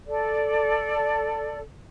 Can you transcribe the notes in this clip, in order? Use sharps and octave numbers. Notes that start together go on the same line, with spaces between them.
A4 D5